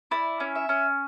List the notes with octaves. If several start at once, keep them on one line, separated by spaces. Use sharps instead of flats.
E4 D5
C#4
E5
C#4